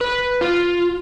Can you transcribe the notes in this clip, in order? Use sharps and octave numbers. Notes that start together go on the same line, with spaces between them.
B4
F4